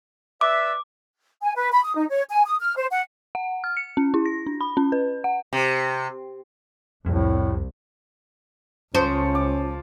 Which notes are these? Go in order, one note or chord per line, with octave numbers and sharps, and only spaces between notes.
B4 D5 E5 D6
G#5
B4
B5
D#6
D#4
C#5
G#5
D#6
F6
C5
F#5
F#5
F6
C#7
C#4
E4
A#6
D4
B5
C#4
B4
F#5
C3
C2 F2 A2
C#2 F3 C#4 C5 C#6
D6